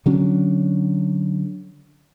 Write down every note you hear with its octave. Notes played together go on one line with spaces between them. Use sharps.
D3 F#3 C#4 D4